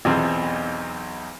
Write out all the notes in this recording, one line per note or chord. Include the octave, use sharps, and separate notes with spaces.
B1 E2 B2 C4